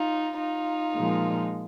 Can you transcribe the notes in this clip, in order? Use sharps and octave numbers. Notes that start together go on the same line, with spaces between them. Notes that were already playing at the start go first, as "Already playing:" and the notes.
Already playing: D#4 F4
D#4 F4
A#2 F3 G#3